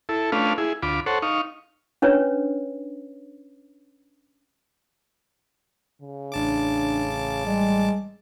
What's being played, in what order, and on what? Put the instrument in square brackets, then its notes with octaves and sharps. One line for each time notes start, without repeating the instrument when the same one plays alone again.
[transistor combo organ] E4 A4
A3 C#4 D4 F4 B4 F5
E4 G#4
D2 F4 B5 D6
A4 C5 C#5 F#5
D#4 F5 C#6
[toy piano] C#4 D4 B4 C#5
[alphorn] C#3
[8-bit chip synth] A1 A5 D6 [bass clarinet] D4
[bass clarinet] G3 [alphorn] G#3